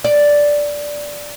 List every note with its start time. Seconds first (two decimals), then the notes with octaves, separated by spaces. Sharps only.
0.05 D5